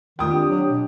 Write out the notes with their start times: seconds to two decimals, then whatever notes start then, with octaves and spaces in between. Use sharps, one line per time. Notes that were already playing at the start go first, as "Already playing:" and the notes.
0.19 D#3 C4 F4 D5 G5 D#6
0.31 D4 G4
0.49 F#3
0.69 B2